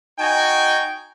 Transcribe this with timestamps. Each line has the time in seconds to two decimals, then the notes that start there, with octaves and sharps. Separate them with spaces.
0.19 D#4 F#4 G5 G#5